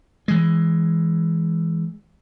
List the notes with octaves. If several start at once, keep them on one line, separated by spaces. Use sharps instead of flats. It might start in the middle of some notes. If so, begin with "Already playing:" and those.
E3 G#3